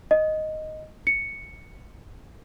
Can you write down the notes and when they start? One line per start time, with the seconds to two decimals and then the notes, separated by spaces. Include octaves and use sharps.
0.11 D#5
1.07 C#7